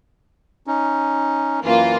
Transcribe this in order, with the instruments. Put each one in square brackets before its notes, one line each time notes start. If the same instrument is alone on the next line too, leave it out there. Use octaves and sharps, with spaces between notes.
[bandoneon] C#4 D#4
[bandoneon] F#2 E3 [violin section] A#3 F4